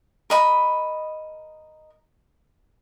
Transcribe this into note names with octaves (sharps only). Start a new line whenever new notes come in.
A#4 D#5 B5